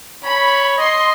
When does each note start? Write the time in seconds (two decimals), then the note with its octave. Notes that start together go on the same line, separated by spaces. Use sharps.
0.25 C#5 B5
0.78 D#5 C6